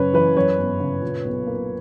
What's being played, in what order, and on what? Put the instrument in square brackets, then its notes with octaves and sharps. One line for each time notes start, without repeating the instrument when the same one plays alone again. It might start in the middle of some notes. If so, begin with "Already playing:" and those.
Already playing: [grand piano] F#2 C#3 [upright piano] B4 C#5
[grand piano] E3 [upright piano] B4
[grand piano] F#2 [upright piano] C#5
[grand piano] G1
C#3
A#2
B1
A#3